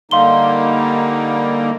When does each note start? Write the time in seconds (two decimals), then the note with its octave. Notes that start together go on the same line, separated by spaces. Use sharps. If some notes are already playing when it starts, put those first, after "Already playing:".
0.11 D3 G3 A#3 D#4 F5 C6 G7